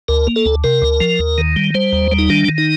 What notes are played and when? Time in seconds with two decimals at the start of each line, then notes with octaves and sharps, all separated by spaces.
0.08 D2 A#4
0.27 A#3
0.36 A4
0.45 D2
0.64 C3 A#4
0.82 D2
1.00 F3
1.19 D#2
1.38 D#3
1.56 G3
1.74 G3 C5
1.93 D#2
2.12 G3
2.19 D#4
2.30 D#3 D4
2.48 D#3
2.58 D#4